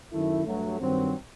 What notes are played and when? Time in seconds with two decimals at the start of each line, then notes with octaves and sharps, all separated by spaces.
0.12 F#2 D#3 A3 E4
0.45 G2 F#3 A3
0.80 G2 D#3 F#3 C4